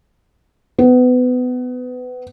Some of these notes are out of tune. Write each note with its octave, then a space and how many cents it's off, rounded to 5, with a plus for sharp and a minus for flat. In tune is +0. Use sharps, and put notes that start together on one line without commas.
B3 +25